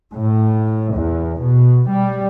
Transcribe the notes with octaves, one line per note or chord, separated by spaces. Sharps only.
A2
E2
B2
G3